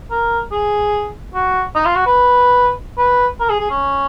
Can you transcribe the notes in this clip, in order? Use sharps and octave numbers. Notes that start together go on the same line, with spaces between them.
A#4
G#4
F#4
D#4
F4
F#4
B4
B4
A#4
G#4
G#4
C#4